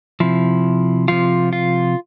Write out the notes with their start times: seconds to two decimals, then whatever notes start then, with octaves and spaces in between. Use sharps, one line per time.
0.20 C3 F3 E4
1.08 C3 F3 F4
1.53 F4